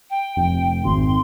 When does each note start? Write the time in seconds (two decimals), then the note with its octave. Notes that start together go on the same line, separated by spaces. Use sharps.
0.10 G5
0.37 F1 G5
0.84 G#1 C6